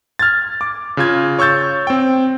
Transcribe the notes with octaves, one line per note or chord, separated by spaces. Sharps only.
F6 G#6 A6
D6
C#3 F4 G#6
C#5 C#6 E6 G6 A6
C4 G5